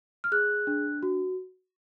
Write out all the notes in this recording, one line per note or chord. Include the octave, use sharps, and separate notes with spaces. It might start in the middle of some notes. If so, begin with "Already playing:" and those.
F6
G#4 F#6
D4
F#4